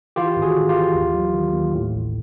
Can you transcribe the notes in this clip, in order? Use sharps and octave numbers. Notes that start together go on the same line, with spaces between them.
E3 F4 G4
G#1
F#4 G#4
G#1
F4 G4
E3
D#2
F#3
D#3
D#2
A2
A1